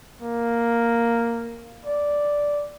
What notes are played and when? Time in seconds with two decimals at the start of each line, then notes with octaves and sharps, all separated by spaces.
0.22 A#3
1.86 D5